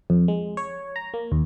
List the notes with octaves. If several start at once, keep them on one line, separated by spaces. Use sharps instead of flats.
F2
G#3
C#5
A#5
A#3
D#2